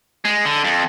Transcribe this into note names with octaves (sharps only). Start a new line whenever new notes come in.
G#3
D3
F2